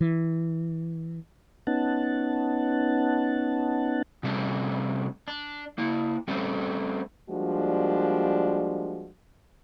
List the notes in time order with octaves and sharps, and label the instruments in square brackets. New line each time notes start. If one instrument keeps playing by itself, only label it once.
[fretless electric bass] E3
[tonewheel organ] B3 C#4 D#4 F#5 A5
[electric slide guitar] C3 G3 A3 C#4 D4
D4
A#3 E4
G3 A3 C4 C#4 A4
[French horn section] F3 G3 G#3 A#3 D4 F#4